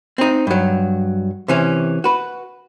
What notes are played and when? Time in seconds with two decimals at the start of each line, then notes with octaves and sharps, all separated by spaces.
0.18 C4 D#4
0.47 G2 F#3
1.48 C3 E3 C#4
2.04 F#4 B4